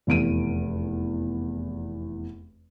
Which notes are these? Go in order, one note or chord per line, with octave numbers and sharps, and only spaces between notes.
F1 E2 D7 D#7